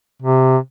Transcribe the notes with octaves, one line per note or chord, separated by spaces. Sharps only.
C3